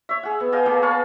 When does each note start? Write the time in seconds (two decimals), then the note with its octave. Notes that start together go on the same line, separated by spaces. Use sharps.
0.09 C#5 E5
0.23 G#4 F#5
0.40 B3
0.52 G#4 D#5 F5 G5
0.66 A#3 B3 G#4
0.82 C#5 F5 A5 B5